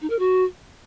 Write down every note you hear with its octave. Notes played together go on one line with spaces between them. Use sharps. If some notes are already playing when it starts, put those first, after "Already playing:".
D#4
A#4
F#4